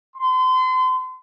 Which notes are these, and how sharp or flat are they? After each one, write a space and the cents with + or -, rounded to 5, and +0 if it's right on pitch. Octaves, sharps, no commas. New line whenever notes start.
C6 -35